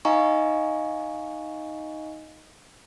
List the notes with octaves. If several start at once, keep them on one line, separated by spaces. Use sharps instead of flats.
D#4 D#5 F5 G#5 A#5 C#6